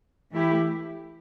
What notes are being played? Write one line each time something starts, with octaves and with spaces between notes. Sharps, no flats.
E3 A3 E4 G4